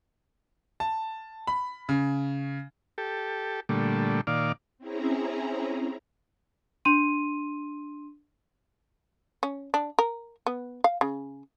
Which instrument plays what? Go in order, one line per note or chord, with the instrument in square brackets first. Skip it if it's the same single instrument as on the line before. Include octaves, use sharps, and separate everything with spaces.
[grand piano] A5
B5
C#3
[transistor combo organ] G4 A4
A#2 D3 G3 A3
A#2 D#3 D5 F5
[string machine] C4 C#4 E4 G#4 A#5
[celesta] D4 C6 D#7
[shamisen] C#4
D4
A#4
B3
F5
C#3